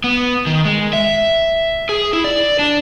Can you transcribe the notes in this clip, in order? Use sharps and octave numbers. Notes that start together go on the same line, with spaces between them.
B3
D#3
G#3
E5
G#4
E4
D5
D4